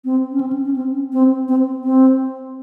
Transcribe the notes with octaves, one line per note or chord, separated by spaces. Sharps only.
C4
C#4
C4
C#4
C#4
C4
C#4
C4
C4
C4